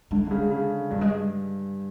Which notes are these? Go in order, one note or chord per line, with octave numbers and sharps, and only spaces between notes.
D3 G#3
D3
C#3 G#3
C#3
G2 G3
G#3